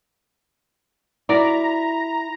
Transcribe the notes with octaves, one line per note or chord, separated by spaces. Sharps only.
E4 F#4 A#4 D5 A#5